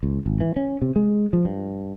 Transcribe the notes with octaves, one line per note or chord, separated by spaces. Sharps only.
C#2
G#1
E3
C#4
C3
G#3
F3
G2